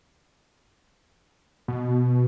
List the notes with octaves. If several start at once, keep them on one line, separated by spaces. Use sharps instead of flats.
B2